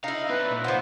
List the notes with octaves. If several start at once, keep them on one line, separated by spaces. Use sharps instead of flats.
D#4 E4 F5
C4 D4 B4
A#2
F3 B3 C5